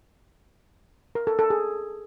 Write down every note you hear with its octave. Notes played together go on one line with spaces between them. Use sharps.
A#4
A4
A4
G#4